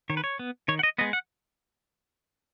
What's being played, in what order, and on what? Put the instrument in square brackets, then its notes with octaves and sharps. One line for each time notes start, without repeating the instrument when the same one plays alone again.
[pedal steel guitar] D#3 C#5
B4
C#5
B3
D#3 C#5
F#5
D#5
G#3 B3 D#5
F#5